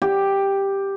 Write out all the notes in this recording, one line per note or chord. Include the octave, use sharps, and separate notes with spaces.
G4